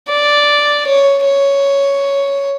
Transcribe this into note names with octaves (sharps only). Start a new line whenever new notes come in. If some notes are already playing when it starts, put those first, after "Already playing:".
D5
C#5
C#5